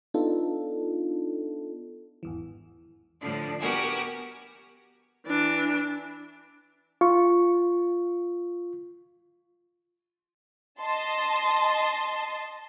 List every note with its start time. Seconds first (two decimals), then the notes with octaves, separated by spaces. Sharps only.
0.14 B3 D4 D#4 F4 A4
2.23 G#1 E2 E3
3.20 A2 D3 F3 D4
3.59 B3 F#4 G4 A#4 G#5
5.27 E3 D4
7.01 F4 C#6
10.80 D#5 A5 C6